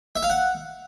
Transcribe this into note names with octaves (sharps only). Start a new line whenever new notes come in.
E5
F5
F#5